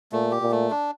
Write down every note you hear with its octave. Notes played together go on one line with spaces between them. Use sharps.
A#2 A3
G4
A#2
A3
D4